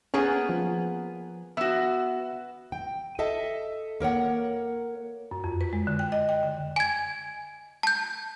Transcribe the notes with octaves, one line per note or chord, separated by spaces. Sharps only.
A#3 B3 C#4 G#4
F3
B3 F#4 E5 E6
G5
A4 D#5 E5 A5
A#3 A#4 C#5 F#5
F#2
F2
B4
G#3
D3
G5
D#5
G5
D3
G#5 G#6
A5 G6